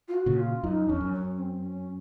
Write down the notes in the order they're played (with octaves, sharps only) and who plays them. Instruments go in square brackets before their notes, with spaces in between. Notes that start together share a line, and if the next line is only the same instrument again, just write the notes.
[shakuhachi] F4
F#4
[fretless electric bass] A#2 C#3
[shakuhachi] F4
[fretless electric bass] F#2 [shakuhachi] D#4
[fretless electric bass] F2 [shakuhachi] C#4
[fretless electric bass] F#2
[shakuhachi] C#4
C4
C#4